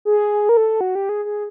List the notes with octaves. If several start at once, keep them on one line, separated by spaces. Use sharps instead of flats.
G#4
A#4
A4
F#4
G4
G#4
G#4